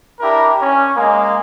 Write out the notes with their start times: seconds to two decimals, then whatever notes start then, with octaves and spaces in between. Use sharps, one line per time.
0.20 D4 E4 G4 A#4
0.62 C#4
0.96 G#3 A#3